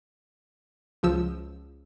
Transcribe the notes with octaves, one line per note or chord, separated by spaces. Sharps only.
C#2 F3 E6